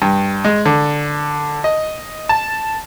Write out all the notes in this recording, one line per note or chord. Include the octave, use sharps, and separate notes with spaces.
G2
G#3
D3
D#5
A5